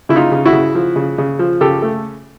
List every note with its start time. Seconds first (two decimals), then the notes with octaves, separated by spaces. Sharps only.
0.09 C#3 E4
0.16 D#4 F4
0.31 C#3
0.46 E4 F#4
0.53 C#3
0.75 F3
0.96 C#3
1.18 C#3
1.39 F3
1.61 C#3 G4 A4
1.82 A3